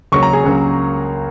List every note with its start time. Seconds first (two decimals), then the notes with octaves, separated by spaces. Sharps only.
0.12 C#2 C#3 F#3 A#3 C#6
0.23 A#5
0.33 G#4
0.44 C#2 C#3 F#3 A#3